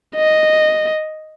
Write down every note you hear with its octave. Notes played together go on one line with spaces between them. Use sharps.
D#5